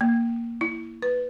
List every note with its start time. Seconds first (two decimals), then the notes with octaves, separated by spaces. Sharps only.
0.01 A#3
0.61 E4
1.02 B4